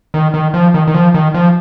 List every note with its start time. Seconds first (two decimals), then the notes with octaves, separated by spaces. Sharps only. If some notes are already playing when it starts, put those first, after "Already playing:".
0.14 D#3
0.34 D#3
0.54 F3
0.74 D#3
0.87 D#3
0.94 F3
1.14 D#3
1.34 F3